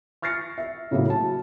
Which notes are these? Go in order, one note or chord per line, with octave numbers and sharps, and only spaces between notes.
C#6 F6 A6 A#6 C7 C#7
E5
A2 C#3 F#3 A#3 E4 F#4
A5